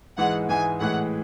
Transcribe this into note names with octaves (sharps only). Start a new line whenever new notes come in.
G#2 E3 G#3 F#5
G#2 E3 G#3 G#5
A2 E3 G#3 F#5